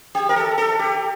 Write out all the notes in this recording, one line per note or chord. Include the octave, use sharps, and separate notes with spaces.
G4
A#4
A4
A4
G4